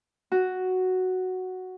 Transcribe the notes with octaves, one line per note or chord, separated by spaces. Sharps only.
F#4